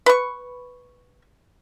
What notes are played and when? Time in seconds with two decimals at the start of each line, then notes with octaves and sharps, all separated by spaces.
0.06 B4 C#6